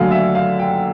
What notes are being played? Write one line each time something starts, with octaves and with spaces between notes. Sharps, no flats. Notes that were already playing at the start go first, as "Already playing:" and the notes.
Already playing: D#2 D3 F#3 A3 F5 G#5
E5
F5
G5